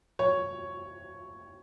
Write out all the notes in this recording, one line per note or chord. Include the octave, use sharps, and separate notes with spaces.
C#5